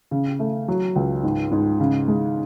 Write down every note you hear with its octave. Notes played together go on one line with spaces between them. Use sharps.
C#3
A3
F#3
C#2
G#2
G#2
C#3
G#3